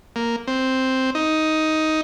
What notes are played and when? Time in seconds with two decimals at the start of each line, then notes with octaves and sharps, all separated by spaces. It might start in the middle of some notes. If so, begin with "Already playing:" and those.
0.16 A#3
0.47 C4
1.15 D#4